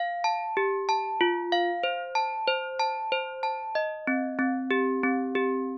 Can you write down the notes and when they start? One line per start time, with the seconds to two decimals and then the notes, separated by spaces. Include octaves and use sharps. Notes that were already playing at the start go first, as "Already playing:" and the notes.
Already playing: F5
0.24 A5
0.57 G4
0.89 A5
1.21 F4
1.52 F5
1.83 C5
2.15 A5
2.47 C5
2.79 A5
3.12 C5
3.43 A5
3.75 D#5
4.07 C4
4.39 C4
4.71 G4
5.04 C4
5.35 G4